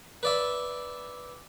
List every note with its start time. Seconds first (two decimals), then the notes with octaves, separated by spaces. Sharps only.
0.23 B4 D5 E5